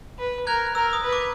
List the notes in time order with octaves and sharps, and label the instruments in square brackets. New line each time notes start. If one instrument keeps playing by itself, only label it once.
[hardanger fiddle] B4
[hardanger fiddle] A#4 [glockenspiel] F#6 G#6
[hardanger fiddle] A#4 [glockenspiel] E6
[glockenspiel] D#6
[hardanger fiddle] B4
[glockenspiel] D6